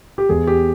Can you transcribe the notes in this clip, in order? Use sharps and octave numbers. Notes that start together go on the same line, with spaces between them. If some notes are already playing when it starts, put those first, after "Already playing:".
G4
E2 G#4
G4